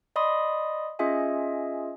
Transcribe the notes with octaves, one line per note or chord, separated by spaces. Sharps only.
D5 D#5 B5 C6 D#6
C#4 F4 G#4 D#5 E5 G#5